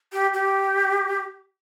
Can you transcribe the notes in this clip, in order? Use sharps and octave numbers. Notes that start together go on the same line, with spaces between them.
G4
G4